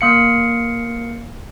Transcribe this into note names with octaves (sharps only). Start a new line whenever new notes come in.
A#3 F5 C#7